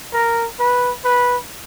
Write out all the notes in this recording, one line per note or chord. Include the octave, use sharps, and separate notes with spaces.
A#4
B4
B4